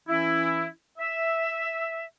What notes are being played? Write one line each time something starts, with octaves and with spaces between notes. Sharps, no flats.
E3 C#4 E4
E5